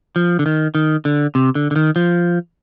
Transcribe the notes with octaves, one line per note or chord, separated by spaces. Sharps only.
F3
D3
D#3
D#3
D3
C3
D3
D3
D#3
F3